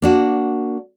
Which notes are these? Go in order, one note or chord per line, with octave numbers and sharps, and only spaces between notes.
A#3 D4 F#4